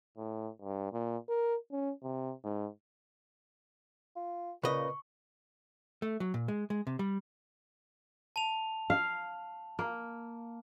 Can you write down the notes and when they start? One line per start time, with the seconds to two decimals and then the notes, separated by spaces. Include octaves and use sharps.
0.17 A2
0.62 G2
0.93 A#2
1.29 A#4
1.72 C#4
2.03 C3
2.44 G#2
4.16 F4
4.63 A#2 C#3 B4 D#5 C#6
6.02 A3
6.20 F#3
6.34 A#2
6.48 G#3
6.70 G#3
6.87 C3
6.99 G3
8.36 A5 F7
8.90 F5
9.79 A#3